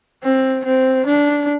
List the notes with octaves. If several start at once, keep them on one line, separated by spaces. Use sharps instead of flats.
C4
C4
D4